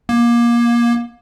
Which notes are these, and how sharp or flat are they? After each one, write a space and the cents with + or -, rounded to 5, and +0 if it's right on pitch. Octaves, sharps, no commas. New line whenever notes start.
A#3 +25